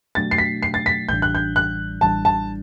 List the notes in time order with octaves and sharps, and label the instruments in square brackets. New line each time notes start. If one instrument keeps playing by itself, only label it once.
[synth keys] B2 F#3 A3 D4 F#4 [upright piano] A6
[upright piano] C7
B6
C7
A6
B6
[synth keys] A1 A2 E3 G3 D4 [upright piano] G6
[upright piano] F#6
G6
F#6
[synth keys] A1 A2 E3 G3 D4 [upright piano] A5
[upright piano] A5